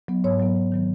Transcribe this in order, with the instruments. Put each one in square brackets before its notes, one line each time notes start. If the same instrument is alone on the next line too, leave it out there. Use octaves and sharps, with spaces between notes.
[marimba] F#3 B3
G#2 C#5
F#3 B3
G#2
D#3 F#3 B3